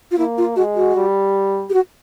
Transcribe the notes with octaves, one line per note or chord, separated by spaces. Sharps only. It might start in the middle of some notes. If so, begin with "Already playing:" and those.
F4
A#3 E4
F4
G#3 F#4
F#4
G3
G4
F#4